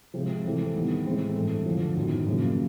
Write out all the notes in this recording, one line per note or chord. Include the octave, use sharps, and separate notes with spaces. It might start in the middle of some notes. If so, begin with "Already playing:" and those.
C3 F3 G#3
C3 E3 A3 C4
D#3 G3 B3
A2 E3 G#3 C4
G2 E3 A3
F2 D3 F3
F#2 D#3 F#3 B3 E4
F#2 C#3 F3 A#3